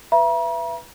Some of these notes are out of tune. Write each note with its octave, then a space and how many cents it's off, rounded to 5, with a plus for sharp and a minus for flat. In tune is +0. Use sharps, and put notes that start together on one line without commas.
B4 +0 E5 +30 A#5 +45